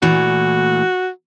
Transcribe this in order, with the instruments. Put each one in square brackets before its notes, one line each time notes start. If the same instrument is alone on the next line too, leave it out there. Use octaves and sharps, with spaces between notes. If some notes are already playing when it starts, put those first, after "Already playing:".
[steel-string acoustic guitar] A#2 E3 A3 [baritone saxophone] F#4